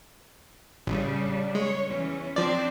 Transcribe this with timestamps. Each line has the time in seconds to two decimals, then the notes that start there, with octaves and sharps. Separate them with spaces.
0.87 A1 C#3 G3 D4
1.55 G#3 C#5
1.88 E2 E3 C#4
2.36 F3 C4 D4 D5